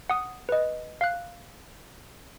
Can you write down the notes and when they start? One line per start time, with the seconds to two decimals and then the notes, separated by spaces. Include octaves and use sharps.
0.10 F#5 D#6
0.49 B4 D#5
1.01 F5 F#6